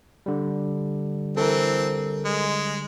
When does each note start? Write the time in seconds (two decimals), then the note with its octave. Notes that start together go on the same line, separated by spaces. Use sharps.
0.26 D3 G3
1.37 E3 C4 A4 A#4
2.25 G#3